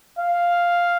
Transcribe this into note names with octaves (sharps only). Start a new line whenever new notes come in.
F5